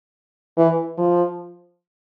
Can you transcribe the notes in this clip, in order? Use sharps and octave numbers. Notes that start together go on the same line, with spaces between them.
E3
F3